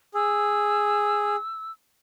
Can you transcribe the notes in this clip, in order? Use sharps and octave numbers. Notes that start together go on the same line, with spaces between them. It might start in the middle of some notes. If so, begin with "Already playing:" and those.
G#4 E6